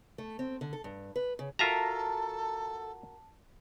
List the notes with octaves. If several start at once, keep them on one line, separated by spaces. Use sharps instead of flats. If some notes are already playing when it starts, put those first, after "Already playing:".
A3
C4
D3
A4
G2
B4
C#3
F4 F#4 A4 A#4 E5 A5 A#5